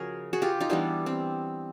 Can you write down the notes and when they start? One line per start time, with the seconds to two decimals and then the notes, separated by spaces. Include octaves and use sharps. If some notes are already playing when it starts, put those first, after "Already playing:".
Already playing: C#3 F3 F#4 G#4 A#4
0.33 F#4 G#4
0.42 F4 G4
0.60 D#4 F4
0.69 E3 G3 B3 D4 E4
1.06 C4